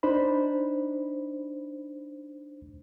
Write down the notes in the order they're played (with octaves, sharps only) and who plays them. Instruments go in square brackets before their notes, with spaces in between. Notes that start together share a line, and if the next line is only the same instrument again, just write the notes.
[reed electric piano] D4 D#4 C5 B5